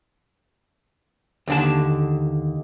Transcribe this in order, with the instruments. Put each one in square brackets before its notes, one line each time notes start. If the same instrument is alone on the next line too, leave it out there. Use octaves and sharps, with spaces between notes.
[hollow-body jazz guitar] D#2 D3 A5